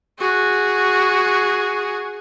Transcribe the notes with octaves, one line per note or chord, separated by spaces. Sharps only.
F#4 G#4